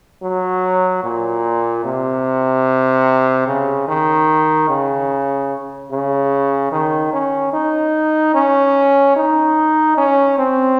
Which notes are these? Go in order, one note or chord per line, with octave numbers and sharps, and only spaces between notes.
F#3
A#2
C3
C#3
D#3
C#3
C#3
D#3
C#4
D#4
C#4
D#4
C#4
C4